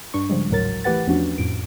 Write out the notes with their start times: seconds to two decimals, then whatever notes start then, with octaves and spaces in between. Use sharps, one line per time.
0.14 G2 D4 C#6
0.29 C#3 F3 G3 G#3
0.50 G#1 D2 A2 F#3 A#4 A6
0.84 E3 A3 G4 B4 F#5 A6
1.07 E2 F3 A3 C#4 D4 F#4
1.38 F2 A2 D7